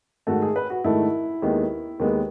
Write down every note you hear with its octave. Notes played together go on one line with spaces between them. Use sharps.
G#2 D#3 A3 F#4
G#4
B4
F#4
G#2 D#3 A3 E4
D#2 D#3 G#3 B3
D#2 D#3 G#3 B3